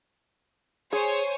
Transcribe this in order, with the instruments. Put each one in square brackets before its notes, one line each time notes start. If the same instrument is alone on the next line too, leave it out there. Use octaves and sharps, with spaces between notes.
[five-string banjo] G#4 [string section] C5 C#5 G#5